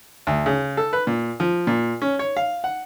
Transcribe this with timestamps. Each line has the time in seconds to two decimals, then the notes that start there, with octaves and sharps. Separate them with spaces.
0.27 D2
0.46 C#3
0.77 A4
0.93 B4
1.07 A#2
1.40 F3
1.67 A#2
2.02 C#4
2.19 C#5
2.37 F5
2.64 F#5